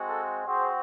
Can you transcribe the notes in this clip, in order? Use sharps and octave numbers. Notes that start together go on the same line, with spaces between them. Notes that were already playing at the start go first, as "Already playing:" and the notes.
Already playing: G#3 C4 F#4
A4
C4 F#4 G#4 C5